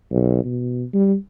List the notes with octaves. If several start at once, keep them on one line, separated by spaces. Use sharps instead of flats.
B1
B2
G3